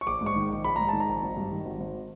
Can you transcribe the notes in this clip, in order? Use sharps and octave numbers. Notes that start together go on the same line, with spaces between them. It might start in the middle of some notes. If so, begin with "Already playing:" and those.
C#6
A#1 D6
G#2
C#6
D#3
A#1
A#1 B5
G#2 A#5
D#3 A5
A#5
A#1
G#1
G2
D#3
G#1
G#1